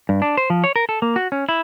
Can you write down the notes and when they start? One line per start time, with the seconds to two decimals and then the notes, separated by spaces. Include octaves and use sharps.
0.09 G2
0.22 D4
0.37 C5
0.50 F3
0.64 C#5
0.76 A#4
0.89 A4
1.02 A#3
1.16 F#4
1.32 C#4
1.49 E4